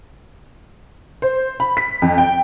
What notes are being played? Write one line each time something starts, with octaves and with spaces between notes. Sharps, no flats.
C5
B5
B6
F2
G5